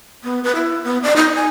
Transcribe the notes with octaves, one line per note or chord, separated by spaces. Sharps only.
B3
B4
E4
B3
D5
D#4
G#5